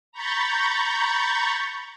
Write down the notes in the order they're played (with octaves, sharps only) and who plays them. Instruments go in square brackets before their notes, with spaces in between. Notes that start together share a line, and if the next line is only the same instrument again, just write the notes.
[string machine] A#5 B5 C#6 G6 A6